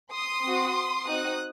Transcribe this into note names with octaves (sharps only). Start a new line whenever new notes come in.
C6 D#6
C4 F#4
C4 D#4 F#4 D#6 F#6